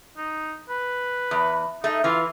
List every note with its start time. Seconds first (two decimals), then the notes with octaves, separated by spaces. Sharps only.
0.17 D#4
0.69 B4
1.31 E2
1.84 A3 D#4
2.04 E3 F4